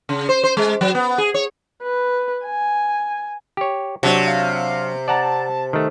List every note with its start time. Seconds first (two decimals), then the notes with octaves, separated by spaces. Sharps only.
0.09 C#3
0.29 C5
0.44 C5
0.57 G#3
0.81 F#3
0.95 B3
1.18 G#4
1.34 C#5
1.82 B4
2.44 G#5
3.57 G4 C#5
4.03 C3 F#3 D4 F#4
4.28 F5
5.08 D5 F#5 A5 A#5
5.73 D#3 A3